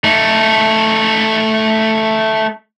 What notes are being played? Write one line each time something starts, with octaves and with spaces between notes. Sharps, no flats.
A3 D#4